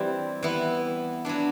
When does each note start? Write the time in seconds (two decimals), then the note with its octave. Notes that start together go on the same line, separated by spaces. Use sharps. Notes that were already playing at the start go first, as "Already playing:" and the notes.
Already playing: E3 G3 C4 E4
0.43 E3 B3 E4
1.25 F#3 B3 D4